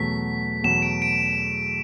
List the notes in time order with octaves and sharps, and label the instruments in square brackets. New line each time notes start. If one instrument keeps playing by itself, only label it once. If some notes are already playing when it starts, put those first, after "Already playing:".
Already playing: [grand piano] E2 B2 F#3 A3 [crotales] B6
[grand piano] E2 B2 F#3 A3 [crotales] E7
[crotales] D7
D7